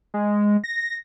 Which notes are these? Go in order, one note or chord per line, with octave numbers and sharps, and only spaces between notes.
G#3
A#6